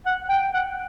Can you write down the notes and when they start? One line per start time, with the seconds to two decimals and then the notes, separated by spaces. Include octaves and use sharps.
0.06 F#5
0.29 G5
0.54 F#5